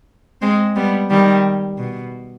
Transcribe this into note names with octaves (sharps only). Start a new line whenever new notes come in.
G#3 C4
G3 B3
D#3 G3
B2